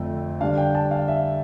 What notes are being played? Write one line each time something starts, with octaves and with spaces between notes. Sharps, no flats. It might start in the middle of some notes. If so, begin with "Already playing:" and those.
Already playing: F2 D3 A3 C4
D3 G3 D4 F5
G5
A5
F5
E5